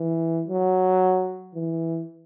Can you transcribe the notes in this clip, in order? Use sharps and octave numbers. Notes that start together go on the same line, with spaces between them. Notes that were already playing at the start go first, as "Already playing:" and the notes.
Already playing: E3
F#3
E3